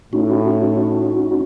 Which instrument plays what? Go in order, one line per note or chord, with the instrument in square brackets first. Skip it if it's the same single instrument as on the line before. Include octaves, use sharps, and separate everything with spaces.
[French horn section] A2 [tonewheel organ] C#4 D#4 F#4